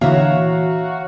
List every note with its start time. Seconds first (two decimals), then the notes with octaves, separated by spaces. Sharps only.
0.01 A#2 D3 E3 F#4 C#5 E5 F5 A#5